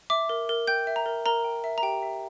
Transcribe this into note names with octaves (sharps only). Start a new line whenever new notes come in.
E5 D6
A#4
A#4
G5 G6
E5
A#5
A#4
A#4 A#5
G5
E5
A#5
G4 G5
E5